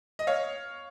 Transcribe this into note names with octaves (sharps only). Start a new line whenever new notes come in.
D#5
C#5 F5